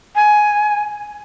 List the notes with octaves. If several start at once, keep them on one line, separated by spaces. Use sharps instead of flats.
G#5